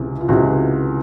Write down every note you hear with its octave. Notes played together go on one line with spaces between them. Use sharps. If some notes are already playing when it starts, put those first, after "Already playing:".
Already playing: C#2 C3 E3
F4
C#2 C3 E3 F#4